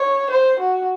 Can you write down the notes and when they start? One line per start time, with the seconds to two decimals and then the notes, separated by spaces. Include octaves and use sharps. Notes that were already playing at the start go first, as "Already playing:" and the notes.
Already playing: C#5
0.30 C5
0.59 F#4